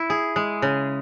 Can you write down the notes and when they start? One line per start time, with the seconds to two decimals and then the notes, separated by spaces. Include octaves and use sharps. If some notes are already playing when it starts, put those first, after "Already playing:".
Already playing: E4
0.10 G#4
0.36 G#3
0.62 C#3